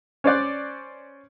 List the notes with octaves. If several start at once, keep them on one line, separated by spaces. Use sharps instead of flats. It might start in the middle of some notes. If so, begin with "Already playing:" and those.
C#4 C5 D5 F#6